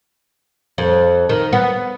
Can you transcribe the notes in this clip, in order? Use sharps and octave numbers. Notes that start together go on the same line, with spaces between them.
F2
D#3
B3